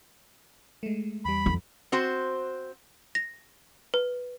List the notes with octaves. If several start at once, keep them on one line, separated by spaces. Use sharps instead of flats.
G#3 A3
E2 G3 B5
F2
C4 F#4 C5
A#6
B4